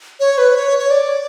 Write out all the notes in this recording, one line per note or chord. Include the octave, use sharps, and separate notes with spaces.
C#5
B4
C#5
C#5
D5